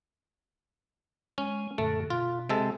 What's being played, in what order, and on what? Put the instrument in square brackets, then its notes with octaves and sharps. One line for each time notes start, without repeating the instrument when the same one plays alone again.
[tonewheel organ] G#3 [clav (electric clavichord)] C#4
[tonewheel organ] F#2 A#2 D3 [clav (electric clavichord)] A3
[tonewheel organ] B2 [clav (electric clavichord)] F4
[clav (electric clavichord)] C3 G#3 A4